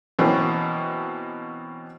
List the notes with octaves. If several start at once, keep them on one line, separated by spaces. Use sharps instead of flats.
B2 E3 F#3 A#3 C4 C#4